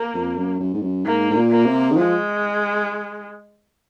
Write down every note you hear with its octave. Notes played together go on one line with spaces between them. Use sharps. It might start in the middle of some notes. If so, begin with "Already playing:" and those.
Already playing: A#3
F2
F#2
F#2
G#2
F#2
G#2 A#3
G#2
A#2
A#3
C3
D#3
F3 G#3